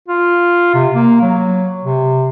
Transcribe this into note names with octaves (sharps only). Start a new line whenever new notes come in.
F4
C3
A#3
F#3
C3